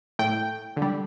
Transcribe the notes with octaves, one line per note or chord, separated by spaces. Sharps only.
A2 A3 G5
D3
G3